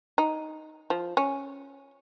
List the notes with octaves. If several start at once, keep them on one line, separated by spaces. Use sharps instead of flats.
D#4
F3
C#4